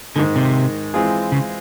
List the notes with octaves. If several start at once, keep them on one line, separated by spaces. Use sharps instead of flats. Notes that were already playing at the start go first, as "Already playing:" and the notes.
G#2 D3 D#3 G#3
C3
E3 G#3 C4 F4 G#4
C#3